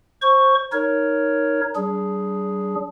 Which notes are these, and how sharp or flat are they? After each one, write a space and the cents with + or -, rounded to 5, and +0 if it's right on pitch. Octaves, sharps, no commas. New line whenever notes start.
C5 +20 C#6 +0
D#4 +0 A#4 +0 C#5 +5
G3 -35 D4 -15 G#4 +0